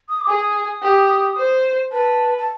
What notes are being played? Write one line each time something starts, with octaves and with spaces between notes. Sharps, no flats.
D#6
D6
G#4 D#6
G4
C5
B4 A5
A5